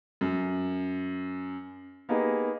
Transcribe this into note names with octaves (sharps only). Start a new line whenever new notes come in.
F#2
A#3 B3 D#4 G4 G#4